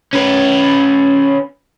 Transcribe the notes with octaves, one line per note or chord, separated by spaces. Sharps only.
C#4 B4